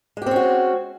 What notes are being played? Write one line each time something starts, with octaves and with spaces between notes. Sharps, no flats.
G#3 C4 C#4 F#4 G4